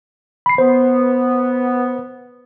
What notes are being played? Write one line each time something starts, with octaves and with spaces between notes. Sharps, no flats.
B5 C7
B3 C5